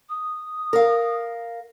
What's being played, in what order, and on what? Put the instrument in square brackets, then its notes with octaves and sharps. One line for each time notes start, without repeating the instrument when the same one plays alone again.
[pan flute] D#6
[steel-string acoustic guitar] A#4 F5